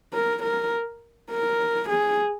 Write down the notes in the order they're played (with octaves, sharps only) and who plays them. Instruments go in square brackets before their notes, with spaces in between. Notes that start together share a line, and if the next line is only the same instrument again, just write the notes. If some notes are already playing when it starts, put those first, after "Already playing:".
[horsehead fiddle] A#4
A#4
A#4
G#4